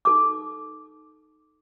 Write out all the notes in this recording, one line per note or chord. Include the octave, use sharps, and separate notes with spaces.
D#4 A4 D6